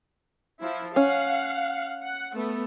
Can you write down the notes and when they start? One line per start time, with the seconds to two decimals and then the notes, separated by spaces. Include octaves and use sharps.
0.61 F3 E4
0.96 C#4 F5 F#5
2.01 F#5
2.34 A3 B3